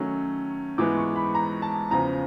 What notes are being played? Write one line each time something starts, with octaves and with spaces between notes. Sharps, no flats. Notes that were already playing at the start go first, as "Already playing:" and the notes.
Already playing: D#3 F#3 A3 C#4
G#2 E3 G#3 B3 D6
C#6
B5
A#5
A5
E2 C#3 F3 A#5